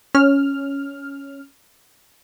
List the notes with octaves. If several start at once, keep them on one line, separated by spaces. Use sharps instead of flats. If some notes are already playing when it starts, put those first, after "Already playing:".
C#4 F6